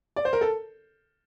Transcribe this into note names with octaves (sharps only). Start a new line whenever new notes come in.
D5
C5
A#4
A4